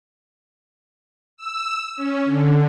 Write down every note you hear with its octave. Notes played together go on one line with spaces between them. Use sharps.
E6
C#4
D3